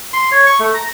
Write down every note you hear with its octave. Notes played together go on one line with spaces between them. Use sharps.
C6
C#5
C#6
A3
A#5